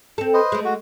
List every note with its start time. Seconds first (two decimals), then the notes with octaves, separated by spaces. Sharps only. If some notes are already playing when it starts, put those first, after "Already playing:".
0.18 C4 A4
0.34 B4 C5 D#5
0.52 G#3 A3
0.65 F#4